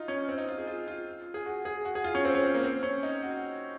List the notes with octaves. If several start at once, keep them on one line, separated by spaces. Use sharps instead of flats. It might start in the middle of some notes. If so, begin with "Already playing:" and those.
Already playing: D#4 F4
C#4
C4
D#4
F4
G#4
F4
F4
G#4
F#4
G#4
F#4
G#4
F4
C#4
C4
C#4
C4
A#3
C4
C#4
D#4
F#4